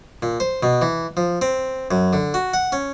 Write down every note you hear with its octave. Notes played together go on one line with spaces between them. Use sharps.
A#2
C5
B2
E3
F3
C4
F#2
D3
F#4
F#5
C#4